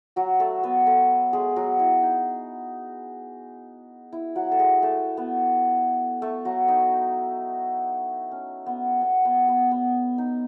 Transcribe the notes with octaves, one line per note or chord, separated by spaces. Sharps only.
F#3 F#4
A3 A4
B3 B4
A3 A4
G#3 G#4
F#3 F#4
E4
D#4
E4
F#3 F#4
A4
G#3 G#4
A3 A4
B3 B4
A3 A4
F#3 F#4
D#4
C#4
B3
B3
B3
B3
B3
D#4